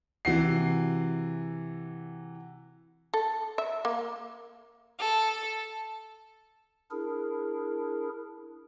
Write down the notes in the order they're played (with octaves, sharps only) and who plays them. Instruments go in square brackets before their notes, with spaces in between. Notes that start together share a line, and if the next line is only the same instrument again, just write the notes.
[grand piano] C3 E3 F#4 C7
[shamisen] A4
E5
A#3
[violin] A4
[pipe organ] D4 E4 G#4 A#4